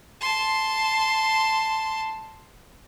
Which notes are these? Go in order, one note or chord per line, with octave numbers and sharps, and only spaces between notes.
A5 C6